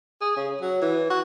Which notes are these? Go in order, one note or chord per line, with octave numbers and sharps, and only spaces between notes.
G#4
C#3
F#3
E3
F#4